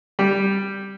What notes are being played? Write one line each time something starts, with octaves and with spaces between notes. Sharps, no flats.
G3